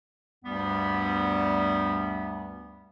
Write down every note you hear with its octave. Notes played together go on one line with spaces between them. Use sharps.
D2 G2 G3 B3